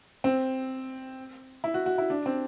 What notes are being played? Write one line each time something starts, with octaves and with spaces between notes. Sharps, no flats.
C4
E4
F#4
F#4
E4
D4
C4